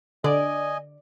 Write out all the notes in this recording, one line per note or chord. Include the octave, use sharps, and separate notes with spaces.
D3 D5 D#5 G#5